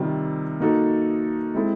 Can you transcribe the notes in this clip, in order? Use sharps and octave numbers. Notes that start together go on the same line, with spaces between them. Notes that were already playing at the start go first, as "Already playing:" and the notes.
Already playing: C3 D#3 G3 C4 F4
A#3 D#4 F#4 A4
G#3 C4 E4 A4